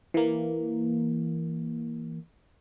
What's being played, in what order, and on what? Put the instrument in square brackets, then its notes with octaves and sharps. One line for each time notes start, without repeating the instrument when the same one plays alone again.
[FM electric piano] E3 A#3